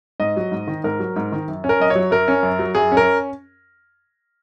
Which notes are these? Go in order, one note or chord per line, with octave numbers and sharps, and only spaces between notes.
G#2 D#5
F#3
G#2
D#3
G#2 A#4
F#3
G#2
D#3
F#2
C#4
A#4
F#2 D#5
C#5
F#3
F#2 A#4
C#4
F#2
F#3
F#2 G#4
C#4
A#4